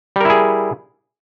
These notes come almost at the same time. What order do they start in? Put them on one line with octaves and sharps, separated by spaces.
G3 A#4 E4 G#4